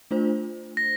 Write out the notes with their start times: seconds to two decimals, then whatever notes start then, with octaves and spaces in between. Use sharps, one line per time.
0.11 A3 D4 F4 C5
0.77 A#6